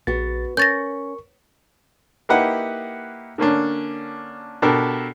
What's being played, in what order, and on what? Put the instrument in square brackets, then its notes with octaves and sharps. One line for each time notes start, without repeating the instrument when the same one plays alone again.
[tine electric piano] A#1 A6 [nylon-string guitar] B3 F#4
[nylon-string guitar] C#4 [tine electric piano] A#4 C#6 [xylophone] G6 A6 A#6
[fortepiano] A#3 D#4 E4 G4 B4 F#5
D3 A#3 C#4 D4
B2 D4 G4 A4 A#4